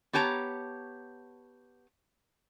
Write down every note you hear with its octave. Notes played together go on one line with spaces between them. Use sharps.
B3 G4 C#5 A5 A#5